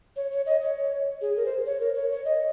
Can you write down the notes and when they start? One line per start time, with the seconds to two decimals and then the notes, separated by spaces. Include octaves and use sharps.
0.16 C#5
0.31 C#5
0.46 D#5
0.62 C#5
1.21 G#4
1.36 A#4
1.45 C5
1.66 C#5
1.80 A#4
1.95 C#5
2.11 C#5
2.25 D#5